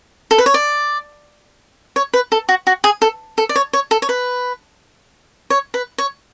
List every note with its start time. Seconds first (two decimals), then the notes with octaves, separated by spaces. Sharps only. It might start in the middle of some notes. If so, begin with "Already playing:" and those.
0.31 A4
0.38 B4
0.46 C#5
0.54 D5
1.96 C#5
2.14 B4
2.32 A4
2.49 F#4
2.67 F#4
2.84 G#4
3.02 A4
3.38 A4
3.49 D5
3.56 C#5
3.73 C#5
3.91 A4
4.02 C#5
4.09 B4
5.50 C#5
5.74 B4
5.98 C#5